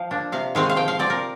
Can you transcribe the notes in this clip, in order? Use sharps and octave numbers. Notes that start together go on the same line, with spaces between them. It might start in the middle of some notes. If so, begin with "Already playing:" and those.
Already playing: F3 F5 G5
A#3 D4
C3 F5
D#3 G#3 C4 F5
F5
F3 G5
F5
C4 D5
A#4